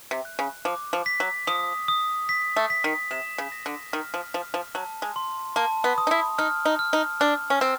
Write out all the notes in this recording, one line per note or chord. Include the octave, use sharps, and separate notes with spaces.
C3
F#6
C#3
F3 D6
F3
B6
F#3
F3 D#6
D#6
B6
A3
B6
D#3
C3 E7
C#3
A#6
D3
D#3 F6
F3
F3 F6
F3
F#3 A5
G#3
C6
A#3 A5
B3
D#6
D#4
E4
D#4 F6
D#4
F6
D#4
D4 F6
C#4
C4 A6